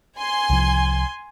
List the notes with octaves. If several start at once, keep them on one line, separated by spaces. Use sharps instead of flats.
G#5 C6
C2 F3